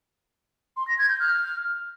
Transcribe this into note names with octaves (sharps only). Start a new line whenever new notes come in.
C6
A#6
G#6
G6
F6